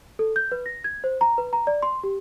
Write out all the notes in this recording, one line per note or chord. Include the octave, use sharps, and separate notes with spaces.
A4
G6
B4
A#6
G#6
C5
A#5
B4
A#5
D5
C6
G4